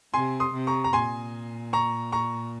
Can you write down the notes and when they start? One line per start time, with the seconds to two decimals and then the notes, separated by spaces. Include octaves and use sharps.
0.14 C3 G#5 C6
0.40 C6 D#6
0.53 C3
0.67 A#5 C#6
0.84 A#5
0.93 A#2 G#5 C6
1.73 A#5 C#6
2.12 A#5 C#6